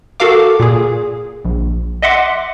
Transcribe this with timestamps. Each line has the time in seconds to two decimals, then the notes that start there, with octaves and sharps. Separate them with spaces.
0.20 F#4 A4 A#4 F5 D6
0.60 A#2 G#4
1.45 A#1
2.02 D#5 E5 F#5 C6 D6